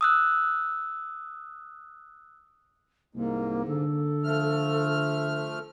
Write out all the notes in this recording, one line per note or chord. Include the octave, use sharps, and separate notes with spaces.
D#6 E6 F#6
C2 G#2 A#3
D3 A4
F3 A3 F6